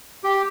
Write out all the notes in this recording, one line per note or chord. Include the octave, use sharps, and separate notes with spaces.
G4